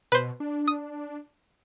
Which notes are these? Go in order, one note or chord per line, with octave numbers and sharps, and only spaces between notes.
B2 B4 C5
D4
D#6